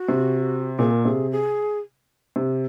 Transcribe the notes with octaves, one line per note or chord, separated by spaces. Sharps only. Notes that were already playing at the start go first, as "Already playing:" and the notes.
Already playing: F#4
C3
A#2 G#4
A#4
C3 G#4
G#4
C3